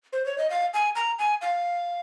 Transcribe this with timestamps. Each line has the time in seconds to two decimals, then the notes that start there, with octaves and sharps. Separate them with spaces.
0.13 C5
0.26 C#5
0.38 D#5
0.50 F5
0.74 G#5
0.95 A#5
1.19 G#5
1.41 F5